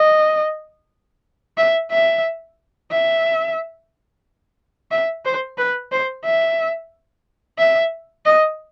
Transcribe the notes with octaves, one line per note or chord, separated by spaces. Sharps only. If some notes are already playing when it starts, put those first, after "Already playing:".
Already playing: D#5
E5
E5
E5
E5
C5
B4
C5
E5
E5
D#5